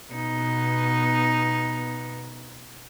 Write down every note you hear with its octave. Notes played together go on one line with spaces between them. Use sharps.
B2 B3 D#4